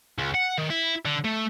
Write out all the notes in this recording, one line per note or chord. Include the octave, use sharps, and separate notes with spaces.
C#2
F#5
D#3
E4
D3
A3